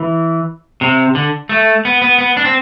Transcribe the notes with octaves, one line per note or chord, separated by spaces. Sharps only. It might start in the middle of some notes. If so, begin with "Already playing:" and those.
Already playing: E3
C3
D3
A3
B3
B3
B3
D4
C4